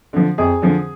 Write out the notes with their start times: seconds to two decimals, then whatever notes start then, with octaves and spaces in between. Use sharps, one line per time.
0.13 D3 F3
0.38 F2 G#4
0.62 D3 F3